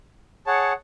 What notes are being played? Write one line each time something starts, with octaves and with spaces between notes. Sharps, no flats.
G#4 C#5 F#5 A5